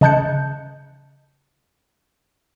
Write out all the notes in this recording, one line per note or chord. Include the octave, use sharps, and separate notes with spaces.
C#3 D#5 A5 F#6 G6 C#7